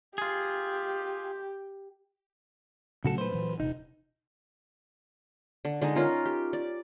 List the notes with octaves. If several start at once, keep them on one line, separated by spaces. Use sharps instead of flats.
F4 G4 G#4
A#2 C#3 F#3 A3 F#4 A4
B4 C5
A#2 E3 F#3
E1 C3 D#4
D3
D3 G#3 D#4
C#4 F4 A#4
G4
D5